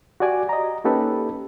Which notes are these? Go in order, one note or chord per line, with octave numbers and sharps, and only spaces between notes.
F#4 G4 D5 G#5 D6
D#5 A#5
A#3 C#4 D#4 G4 A4 B4